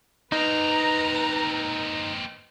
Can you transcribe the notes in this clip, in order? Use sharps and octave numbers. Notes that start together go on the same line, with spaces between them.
A#3 C4 D#4 B4 A#5